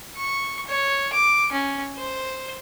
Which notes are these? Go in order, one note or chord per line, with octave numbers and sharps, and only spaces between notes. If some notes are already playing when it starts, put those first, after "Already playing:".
C#6
C#5
D6
C#4
C5